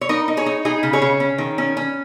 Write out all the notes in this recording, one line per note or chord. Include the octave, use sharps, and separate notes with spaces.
C#5
D#4 A#4 D#5
D#4
G#4 C#5
D#4
D#4 G#4
C#3
G#4 C#5
C#3
C#4
D#3
C#4
C#4